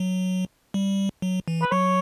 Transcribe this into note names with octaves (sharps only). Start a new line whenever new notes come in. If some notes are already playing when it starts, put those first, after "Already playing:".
Already playing: F#3
G3
F#3
E3
B4
F#3 C#5